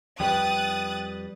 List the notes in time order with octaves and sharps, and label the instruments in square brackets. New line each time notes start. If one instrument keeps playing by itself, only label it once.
[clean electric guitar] F2 G3 B4 [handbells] G5 [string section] D#6 F#6 A6